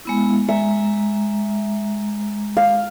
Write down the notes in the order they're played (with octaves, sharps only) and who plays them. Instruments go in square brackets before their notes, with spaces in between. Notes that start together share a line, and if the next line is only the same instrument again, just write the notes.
[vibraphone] G#3 B3 E4
[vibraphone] G#3 A#5 [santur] E5
[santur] F5